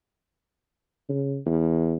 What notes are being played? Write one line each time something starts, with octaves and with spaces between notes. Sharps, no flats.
C#3
E2